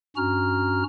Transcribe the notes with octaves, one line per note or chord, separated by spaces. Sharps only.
G2 C#4 F#4 A#5 F6